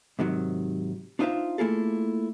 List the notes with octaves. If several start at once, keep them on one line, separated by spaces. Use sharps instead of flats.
G#2 C3 D#3 F#3
D4 D#4 F4 C5 E5 F5
A3 A#3 E4 F4 G#4 A4